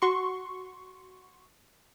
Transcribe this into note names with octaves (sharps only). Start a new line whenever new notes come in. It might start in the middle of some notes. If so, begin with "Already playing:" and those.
F#4 C6 C#6